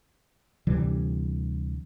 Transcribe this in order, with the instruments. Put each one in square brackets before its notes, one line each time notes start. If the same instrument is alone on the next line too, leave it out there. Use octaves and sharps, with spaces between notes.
[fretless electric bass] D2 C3 E3 G3